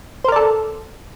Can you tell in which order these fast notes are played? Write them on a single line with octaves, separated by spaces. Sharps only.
C5 A#4 D5 A4